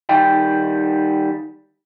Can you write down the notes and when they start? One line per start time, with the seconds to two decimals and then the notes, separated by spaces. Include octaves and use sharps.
0.09 D#3 G3 G5